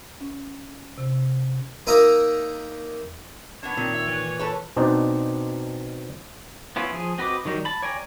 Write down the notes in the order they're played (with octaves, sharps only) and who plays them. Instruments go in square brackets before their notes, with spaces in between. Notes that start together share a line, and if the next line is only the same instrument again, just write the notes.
[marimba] C#4
C3
[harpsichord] A#3 D#4 E5 A#5 D#6
[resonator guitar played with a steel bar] B3 D4 [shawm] C#5
[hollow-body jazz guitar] A#2 [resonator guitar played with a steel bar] D#3 [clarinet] C4
[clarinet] E5
E3
[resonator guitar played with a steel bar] A4 B4 C#5
[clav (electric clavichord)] B2 C4 D4 D#4
[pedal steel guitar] B3 C#4 E4 F4
F3 G#4
C4 F#4 B4 D#5 D6
D#3 F#3 G3 D#4
A5 B5
C#5 D5 G5 G#5 A#5